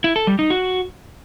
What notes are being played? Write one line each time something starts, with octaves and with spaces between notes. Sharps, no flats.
E4
A4
G3
D#4
F#4